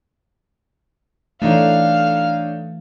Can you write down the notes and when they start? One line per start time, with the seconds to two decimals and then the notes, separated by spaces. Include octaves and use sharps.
1.42 E3 A3 D4 D#4 C#5 F5